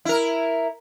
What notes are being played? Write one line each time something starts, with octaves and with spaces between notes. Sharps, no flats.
E4 A#4